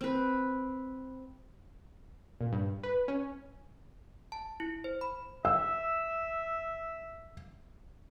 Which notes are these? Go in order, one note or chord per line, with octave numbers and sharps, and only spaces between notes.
C4 B4
A#2
G2
B4
C#4
A5
E4
C5
B5
E5 E6